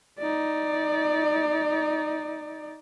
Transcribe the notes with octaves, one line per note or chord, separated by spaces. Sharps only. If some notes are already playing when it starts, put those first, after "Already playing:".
D#4 D5